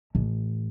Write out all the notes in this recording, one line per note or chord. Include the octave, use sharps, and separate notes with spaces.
A1